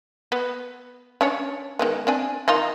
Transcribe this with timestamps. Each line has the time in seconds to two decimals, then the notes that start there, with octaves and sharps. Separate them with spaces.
0.32 B3
1.21 C#4 D4 C#5
1.79 D#3 G#3 B3
2.07 C4 D4 G#5
2.48 D#3 D#4 F4